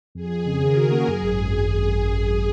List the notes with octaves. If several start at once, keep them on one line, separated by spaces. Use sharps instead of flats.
F2 G#4
F2
C#3
D#3 A#4
F#4
A#3
F#2 G#4
G#1